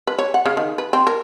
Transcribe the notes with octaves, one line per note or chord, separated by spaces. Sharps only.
B4
C#5
F#5
C#3
D#3
B4
C4
A#4